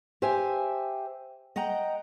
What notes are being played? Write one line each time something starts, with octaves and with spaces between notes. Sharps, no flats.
G4 C5 E5 G5 G#5
D#5 F#5 G5 A#5